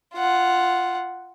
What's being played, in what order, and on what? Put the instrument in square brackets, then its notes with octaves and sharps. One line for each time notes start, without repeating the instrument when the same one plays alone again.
[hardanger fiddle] F4 F#5